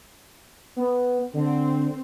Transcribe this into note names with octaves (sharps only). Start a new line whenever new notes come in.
B3
D3 C4